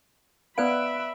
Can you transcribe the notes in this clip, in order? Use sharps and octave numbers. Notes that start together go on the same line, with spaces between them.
B3 B4 D5 E5 F5 B5 F#6 D7